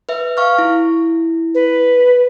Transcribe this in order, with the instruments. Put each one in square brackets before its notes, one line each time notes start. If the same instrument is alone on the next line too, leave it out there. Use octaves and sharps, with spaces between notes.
[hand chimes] B4 E5
F5 C#6 F6
E4
[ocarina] B4